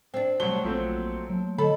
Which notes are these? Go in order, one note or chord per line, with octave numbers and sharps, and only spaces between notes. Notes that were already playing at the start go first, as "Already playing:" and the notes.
C4 D4
C2 F#3 A3 C#5 A5 C6 G7
A#1 F3 A3 A#3 C4 C6
F#3 A3 A#3
D3 A4 C#5 D#5 B5